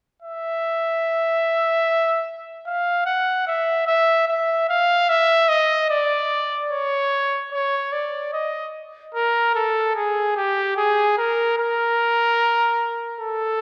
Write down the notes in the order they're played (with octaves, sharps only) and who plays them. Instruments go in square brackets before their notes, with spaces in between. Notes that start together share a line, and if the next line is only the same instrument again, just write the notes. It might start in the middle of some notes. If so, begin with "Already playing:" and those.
[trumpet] E5
F5
F#5
E5
E5
E5
F5
E5
D#5
D5
C#5
C#5
D5
D#5
A#4
A4
G#4
G4
G#4
A#4
A#4
A4